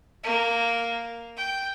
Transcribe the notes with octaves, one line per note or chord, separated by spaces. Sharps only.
A#3
G5